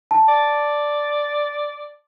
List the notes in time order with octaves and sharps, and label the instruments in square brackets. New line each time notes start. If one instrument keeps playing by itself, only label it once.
[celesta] A5
[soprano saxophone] D5